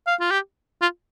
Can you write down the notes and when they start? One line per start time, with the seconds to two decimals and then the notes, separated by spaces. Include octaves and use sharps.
0.07 F5
0.20 F4
0.31 G4
0.81 F4